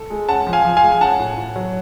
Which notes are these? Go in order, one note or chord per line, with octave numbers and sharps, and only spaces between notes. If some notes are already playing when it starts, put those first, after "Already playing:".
Already playing: A4
G#3
C#4 F#5 A5
F3
F5 G#5
F3
F5 G#5
G#3
G#5
C#4 F#5 A5
A2
A2
F#3